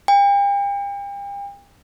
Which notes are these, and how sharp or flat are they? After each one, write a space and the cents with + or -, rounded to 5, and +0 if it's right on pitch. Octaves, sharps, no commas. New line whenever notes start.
G5 +40